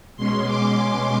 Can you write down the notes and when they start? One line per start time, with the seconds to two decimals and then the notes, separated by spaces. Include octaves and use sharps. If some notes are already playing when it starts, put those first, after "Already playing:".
0.17 B2 G#3 C#4 C6
0.46 D6